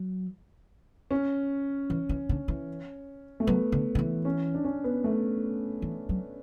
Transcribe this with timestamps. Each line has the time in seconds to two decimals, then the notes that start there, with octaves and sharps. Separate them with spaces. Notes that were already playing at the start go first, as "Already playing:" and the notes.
Already playing: F#3
1.11 C#4
1.90 E3
2.09 E3
2.29 D3
2.48 E3
3.40 A3
3.47 F#3 B3
3.72 D3
3.95 D3
3.99 E3
4.25 C#4
4.54 D4
4.64 C#4
4.84 B3
5.04 A3
5.82 E3
6.09 F#3